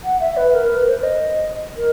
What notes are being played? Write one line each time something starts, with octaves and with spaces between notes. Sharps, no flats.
F#5
E5
B4
A#4
B4
C5
D#5
A#4